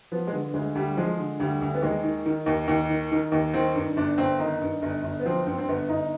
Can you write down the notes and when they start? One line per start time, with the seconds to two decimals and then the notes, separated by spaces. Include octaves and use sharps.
0.12 F3 B3
0.27 G#3
0.32 D3 B3
0.53 D2 G#3
0.75 D2 G3
0.97 F3 G#3
1.18 D3
1.40 D2 G3
1.61 D2
1.74 B3
1.82 D#2 G#3
2.04 D#3
2.26 D#3
2.46 D#2
2.68 D#2
2.89 D#3
3.12 D#3
3.32 D#2
3.54 D#3 C4
3.75 G2
3.96 G1 D4
4.18 G1 C4
4.39 D#3 D#4
4.62 G2
4.82 G1
5.03 G1
5.19 B3
5.26 F3 C4
5.47 G2 C4
5.58 C4
5.68 G1 B3
5.89 G1 D#4